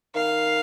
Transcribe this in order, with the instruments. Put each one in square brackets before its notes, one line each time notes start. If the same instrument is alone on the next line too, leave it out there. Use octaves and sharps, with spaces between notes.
[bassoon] D#3 [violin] F5